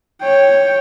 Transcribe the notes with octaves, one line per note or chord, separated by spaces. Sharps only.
C#5 G5